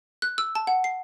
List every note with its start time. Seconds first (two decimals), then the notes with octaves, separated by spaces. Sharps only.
0.22 F#6
0.38 E6
0.55 A5
0.67 F#5
0.84 C7